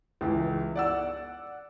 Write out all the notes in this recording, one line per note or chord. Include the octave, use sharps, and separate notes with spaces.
C#2 E3
D5 F#5 E6